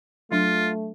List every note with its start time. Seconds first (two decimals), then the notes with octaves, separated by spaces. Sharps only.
0.32 F#3 A3 D4 F4